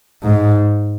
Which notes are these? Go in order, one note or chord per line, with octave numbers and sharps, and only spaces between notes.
G#2